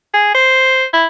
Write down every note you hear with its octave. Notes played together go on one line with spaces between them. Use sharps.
G#4
C5
E4